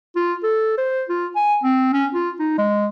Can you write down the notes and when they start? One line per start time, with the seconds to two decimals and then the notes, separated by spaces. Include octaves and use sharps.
0.16 F4
0.43 A4
0.78 C5
1.09 F4
1.36 G#5
1.63 C4
1.93 C#4
2.14 F4
2.39 D#4
2.58 G#3